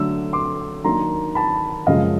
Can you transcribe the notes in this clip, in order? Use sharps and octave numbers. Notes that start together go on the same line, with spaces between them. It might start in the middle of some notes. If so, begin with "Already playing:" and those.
Already playing: D3 F#3 A3 E6
C6 D6
D#3 F#3 A#3 D4 A#5 C6
A5 B5
F#2 C#3 F3 G#3 D#5 F5